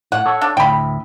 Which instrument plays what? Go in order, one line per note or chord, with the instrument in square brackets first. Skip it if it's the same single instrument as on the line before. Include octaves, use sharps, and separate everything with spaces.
[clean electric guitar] A2 [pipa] F#5
[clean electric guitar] A4 C#5
[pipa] D4
[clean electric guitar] D2 A2 [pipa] G5 B5